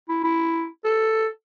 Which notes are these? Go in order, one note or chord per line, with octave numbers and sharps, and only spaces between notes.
E4
E4
A4